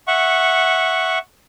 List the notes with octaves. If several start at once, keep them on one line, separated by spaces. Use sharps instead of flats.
E5 F#5 C#6